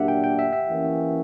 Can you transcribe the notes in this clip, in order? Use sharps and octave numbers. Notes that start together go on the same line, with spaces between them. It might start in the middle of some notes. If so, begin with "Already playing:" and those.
Already playing: A#2 F#3 A#3 D4 G4 E5 F#5
G5
G5
E5
E5
E3 A#3 C#4